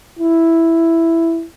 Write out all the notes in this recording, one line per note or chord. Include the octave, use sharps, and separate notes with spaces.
E4